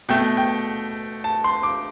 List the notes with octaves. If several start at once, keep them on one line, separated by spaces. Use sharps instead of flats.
B2 A3 G5
G5
A5
C6
D6